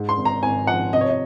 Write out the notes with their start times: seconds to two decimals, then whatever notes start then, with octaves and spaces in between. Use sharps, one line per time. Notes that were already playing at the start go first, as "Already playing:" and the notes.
Already playing: G#2
0.09 C6
0.18 G#1
0.25 A#5
0.43 G#1 G#5
0.67 F3 F#5
0.93 C3 D#5
1.01 C#5
1.09 D#5